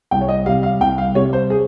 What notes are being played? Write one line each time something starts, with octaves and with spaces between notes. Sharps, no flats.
C2 G5
C#5
D#5
C3 G3 F5
F5
C2 G5
F5
C3 G3 C#5
C5
G#4